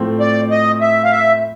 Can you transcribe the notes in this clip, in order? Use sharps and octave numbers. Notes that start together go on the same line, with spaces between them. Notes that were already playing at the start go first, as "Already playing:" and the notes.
Already playing: A2 F3 A3 C4
D5
D#5
E5
F5
E5